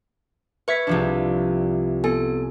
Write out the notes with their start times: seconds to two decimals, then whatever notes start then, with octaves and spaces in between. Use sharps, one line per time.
0.68 B4 E5 C#6 G#6 B6
0.87 C2 F3 D4
2.04 B3 A4 G#5